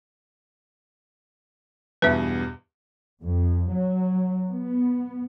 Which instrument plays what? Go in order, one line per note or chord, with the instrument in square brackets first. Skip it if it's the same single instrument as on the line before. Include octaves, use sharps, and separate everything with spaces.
[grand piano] E2 G2 B2 [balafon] B4 E5
[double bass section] F2
F#3
B3